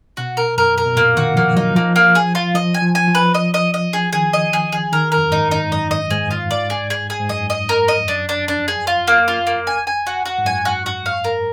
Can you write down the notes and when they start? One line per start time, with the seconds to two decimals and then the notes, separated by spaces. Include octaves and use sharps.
0.17 B2 F#4
0.37 A#4
0.57 F#2 A#4
0.78 A#4
0.86 B2
0.97 A#2 A#3
1.17 D#3 F#4
1.36 F3 A#3
1.56 F#3 D#4
1.75 F3 A#3
1.96 A#3
2.15 G#4
2.35 F4
2.55 F3 D#5
2.74 G#5
2.82 F3
2.95 G#5
3.08 F3
3.15 B4
3.34 D#5
3.54 D#5
3.74 D#5
3.93 G#4
4.13 D#3 G#4
4.33 D#5
4.53 G#4
4.72 G#4
4.92 D#3 A#4
5.12 A#4
5.17 F2
5.25 F#2
5.31 G#2 D#4
5.51 D#4
5.64 G#2
5.71 F#2 D#5
5.91 D#5
6.10 G#2 G#4
6.31 F4
6.51 D5
6.70 G#4
6.90 G#4
7.10 G#4
7.20 G#2
7.29 F#2 D#5
7.50 D#5
7.69 A#4
7.88 D#5
7.98 F2
8.08 F#2 D4
8.29 D4
8.48 F2 D4
8.68 G#4
8.87 F4
9.07 A#3
9.28 F4
9.47 A#3
9.67 G#5
9.87 G#5
10.07 F#4
10.26 F#4
10.38 G#2
10.46 F#2 G#5
10.65 F#4
10.86 F#4
11.06 F5
11.24 A#4